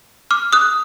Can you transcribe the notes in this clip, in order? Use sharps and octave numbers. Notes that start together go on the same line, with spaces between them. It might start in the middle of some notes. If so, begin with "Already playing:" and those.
D6 F6
D#6 F#6